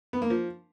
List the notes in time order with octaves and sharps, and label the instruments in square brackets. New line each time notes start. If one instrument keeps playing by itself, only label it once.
[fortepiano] B3
A#3
F3